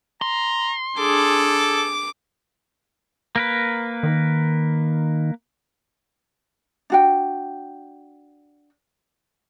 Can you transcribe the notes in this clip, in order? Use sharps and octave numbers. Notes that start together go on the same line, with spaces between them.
A#5 C6
D4 G#4 A4 D6
A#3 A#4 B4
D#3
D4 F#4 G5